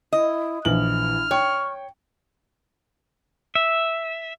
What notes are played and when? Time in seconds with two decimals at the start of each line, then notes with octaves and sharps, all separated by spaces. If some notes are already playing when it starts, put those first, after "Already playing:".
0.12 E4 D#5
0.65 A#1 E3 E4 F6 F#7
1.31 C#5 G5 C#6
3.55 E5